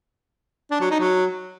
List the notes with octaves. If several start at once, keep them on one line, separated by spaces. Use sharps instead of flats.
D4
F#3
D#4
F#3